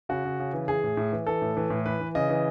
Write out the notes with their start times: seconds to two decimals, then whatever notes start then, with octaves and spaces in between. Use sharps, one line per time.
0.09 C#3 F#4
0.25 C#3
0.40 C#3
0.54 E3
0.68 E3 G#4
0.84 A2
0.97 A2
1.12 E3
1.27 E3 A4
1.42 A2
1.57 E3
1.70 A2
1.86 E3 B4
2.00 E3
2.15 C#3 D#5
2.30 E3